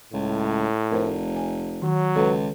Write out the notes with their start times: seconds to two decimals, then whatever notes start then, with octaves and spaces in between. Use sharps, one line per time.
0.13 C#2 A2
0.91 F1 A#4 C5
1.36 G#5
1.82 D#3 F#3
2.16 C#2 A4 B4